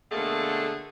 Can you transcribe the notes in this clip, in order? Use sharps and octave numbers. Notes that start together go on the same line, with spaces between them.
B2 D3 A3 A#3 G#4 A4